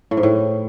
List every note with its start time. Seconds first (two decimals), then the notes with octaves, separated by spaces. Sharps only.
0.11 A2
0.17 G#2
0.23 A2